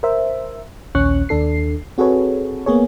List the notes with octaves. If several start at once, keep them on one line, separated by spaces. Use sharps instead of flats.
A#4 C5 E5
A#1 D#2 C#4 C#6 F#6
D#2 D4 A4 C7
C4 F#4 G#4 A4 B4 C#5
A#3 B3 G#4 C#5